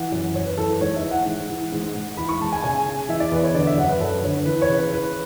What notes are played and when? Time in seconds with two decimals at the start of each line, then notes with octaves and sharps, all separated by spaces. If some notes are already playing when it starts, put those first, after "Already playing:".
Already playing: E3 F#5
0.12 F#2
0.35 F#2 C#5
0.46 B4
0.57 E3 A4
0.70 B4
0.81 G#2 C#5
0.96 E5
1.03 E3
1.11 F#5
1.26 G#2
1.50 E3
1.72 G#2
1.95 G#2
2.17 E3 B5
2.29 C#6
2.41 G#2 A5
2.53 G#5
2.64 C#3 G#5
2.86 C#3
3.09 E3 E5
3.20 D5
3.32 E2 B4
3.43 C#5
3.54 D3 D5
3.67 E5
3.78 F#2 F#5
3.89 B4
4.00 F#2 A4
4.24 D3 C#5
4.35 B4
4.46 E3 B4
4.62 C#5
4.69 C#3
4.77 B4
4.92 E3 B4